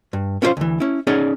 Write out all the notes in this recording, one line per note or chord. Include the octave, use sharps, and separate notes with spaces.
G2
B3 C#4 E4 F4 C5 F5
D2 E3
C#4 E4
C#4 D#4 G#4 D5 F#5